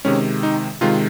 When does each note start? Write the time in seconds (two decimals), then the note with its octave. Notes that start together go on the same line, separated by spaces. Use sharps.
0.05 C3 D#3 G#3 C#4
0.43 D#4
0.81 C3 D#3 G#3 F4